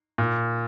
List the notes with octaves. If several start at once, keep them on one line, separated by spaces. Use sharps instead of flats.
A#2